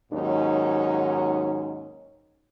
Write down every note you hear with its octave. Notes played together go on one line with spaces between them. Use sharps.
D#2 G#2 F#3 C#4 D#4